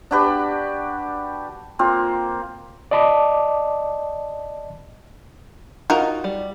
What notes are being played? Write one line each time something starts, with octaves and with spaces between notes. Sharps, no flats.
D4 F#4 G4 B4
A#3 C4 F4
D5 D#5 A5 B5 D6
D#4 F4 F#4 A#4
G3